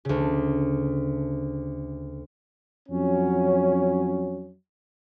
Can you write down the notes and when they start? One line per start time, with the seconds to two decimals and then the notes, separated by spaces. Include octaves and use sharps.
0.05 D2 C#3
2.89 F2 F#3 C#4